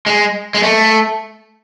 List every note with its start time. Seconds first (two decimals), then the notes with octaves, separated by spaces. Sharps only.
0.06 G#3
0.55 G#3
0.63 A3